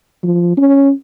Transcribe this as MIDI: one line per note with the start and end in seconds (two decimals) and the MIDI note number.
0.23 0.54 53
0.57 0.91 61